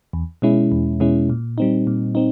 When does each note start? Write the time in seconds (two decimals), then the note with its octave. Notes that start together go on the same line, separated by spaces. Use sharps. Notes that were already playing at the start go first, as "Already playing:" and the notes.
0.13 E2
0.42 B2 G#3 C#4 E4
0.72 E2
1.00 B2 G#3 C#4 E4
1.30 A#2
1.58 G3 C4 D#4
1.87 A#2
2.15 C4 D#4